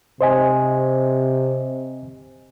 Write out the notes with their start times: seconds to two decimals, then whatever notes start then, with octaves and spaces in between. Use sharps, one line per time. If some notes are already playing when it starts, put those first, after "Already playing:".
0.21 C3 C5 D#5 G#5